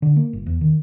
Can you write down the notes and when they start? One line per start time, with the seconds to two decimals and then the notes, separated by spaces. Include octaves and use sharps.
0.02 D3
0.16 A#3
0.33 G1
0.46 E2
0.61 D#3